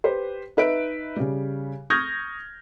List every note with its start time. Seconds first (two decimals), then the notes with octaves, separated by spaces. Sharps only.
0.04 G4 B4 C5
0.57 D#4 B4 E5 D7
1.16 C#3 G3
1.90 C#6 D#6 F6 G6 G#6 A#6